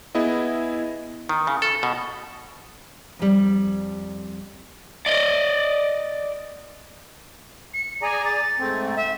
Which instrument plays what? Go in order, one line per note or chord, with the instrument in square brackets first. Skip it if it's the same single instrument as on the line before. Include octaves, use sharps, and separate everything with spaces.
[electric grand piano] B3 E4 G#4 D#5
[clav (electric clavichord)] D#3
C#3
A4
B2
[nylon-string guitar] F2 G3
[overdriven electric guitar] D5 D#5
[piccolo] C#7
[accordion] G#4 D5 A#5 [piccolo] G#5
[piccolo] A6
[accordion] G#2 A3 C4
[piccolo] E5